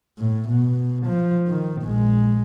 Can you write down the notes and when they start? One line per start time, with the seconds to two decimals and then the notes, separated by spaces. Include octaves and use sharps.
0.18 A2
0.49 B2
1.07 F3
1.48 D#3
1.83 A#1 G#3